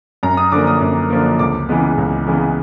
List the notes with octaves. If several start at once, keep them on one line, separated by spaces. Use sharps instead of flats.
F#2 A#5
D#6
D3 F3 A#3 D6
D#6
F#2
D3 F3 A#3
C#2 D6
C#3 E3 G#3 B3
C#2
C#3 E3 G#3 B3